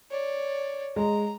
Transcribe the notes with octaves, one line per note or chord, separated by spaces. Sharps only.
C#5 D5
G#3 A#5